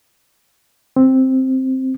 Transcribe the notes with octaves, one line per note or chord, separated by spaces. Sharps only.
C4